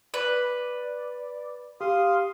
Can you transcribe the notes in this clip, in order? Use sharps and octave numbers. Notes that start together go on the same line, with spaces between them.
B4 D5
G4 F5 C6 D#6